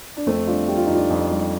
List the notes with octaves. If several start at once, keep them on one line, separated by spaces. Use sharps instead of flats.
D4
F2 A3 C4
G3 D4 F4
G3 G4
F4
F2 D#4
D4 F4
F2
G3